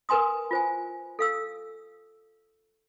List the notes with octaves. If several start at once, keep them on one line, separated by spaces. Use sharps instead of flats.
A#4 B4 G#5 C6 D#6
F4 C5 G#5
A4 F5 E6